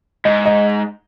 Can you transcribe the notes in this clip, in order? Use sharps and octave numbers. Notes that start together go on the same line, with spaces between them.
G#2 D#5
D#5